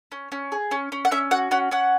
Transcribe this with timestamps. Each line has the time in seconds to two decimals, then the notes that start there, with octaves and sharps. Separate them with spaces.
0.12 C#4
0.32 C#4
0.52 G#4
0.71 C#4
0.92 C#4
1.05 F#5
1.11 C#4 E5
1.31 F#4 F#5
1.51 C#4 F#5
1.71 C#4 F#5